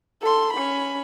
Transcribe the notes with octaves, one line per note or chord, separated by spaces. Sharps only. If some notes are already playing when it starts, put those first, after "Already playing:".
A4 C6
C#4 B5